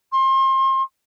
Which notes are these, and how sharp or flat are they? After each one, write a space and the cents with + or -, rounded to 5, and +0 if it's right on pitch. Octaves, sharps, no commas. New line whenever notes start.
C6 +35